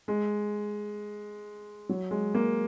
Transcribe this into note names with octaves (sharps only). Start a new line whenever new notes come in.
G#3
F#3
G#3
A#3